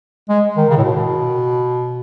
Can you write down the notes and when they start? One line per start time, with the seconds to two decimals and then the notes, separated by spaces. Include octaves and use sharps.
0.29 G#3
0.57 D#3
0.70 C#3
0.77 A2
0.83 B2